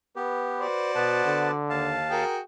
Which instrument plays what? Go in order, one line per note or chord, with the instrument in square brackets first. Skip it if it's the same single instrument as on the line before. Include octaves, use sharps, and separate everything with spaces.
[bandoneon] B3 G4 [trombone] B4
[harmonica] F#4 C5 D5
[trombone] B2 [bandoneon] B3 B4 A5
[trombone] D3
[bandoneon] D#2 F5 A5
[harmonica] F#4 G#4 G5 [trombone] A#4